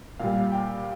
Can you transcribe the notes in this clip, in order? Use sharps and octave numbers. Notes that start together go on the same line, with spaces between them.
A#2 G3 F5
G5